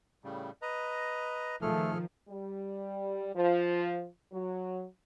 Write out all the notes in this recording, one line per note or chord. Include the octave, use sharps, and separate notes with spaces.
A2 C#3 G3
B4 D#5 A#5
D#3 F3 A3 G#4 A4 F6
G3
F3
F#3